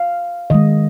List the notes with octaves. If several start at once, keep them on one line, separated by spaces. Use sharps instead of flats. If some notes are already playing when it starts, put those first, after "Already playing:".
Already playing: F5
D#3 G#3 D#5